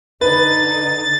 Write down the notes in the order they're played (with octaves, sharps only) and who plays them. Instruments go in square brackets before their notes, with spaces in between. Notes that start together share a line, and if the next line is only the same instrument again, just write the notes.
[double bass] D3 D#4 [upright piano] B4 [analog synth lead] A6